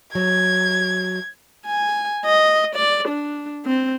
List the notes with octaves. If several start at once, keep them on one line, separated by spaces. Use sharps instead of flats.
F#3 G#6
G#5
D#5
D5
D4
C4